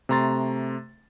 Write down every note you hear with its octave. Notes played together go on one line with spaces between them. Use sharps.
C3 A3 A#5 C6 A6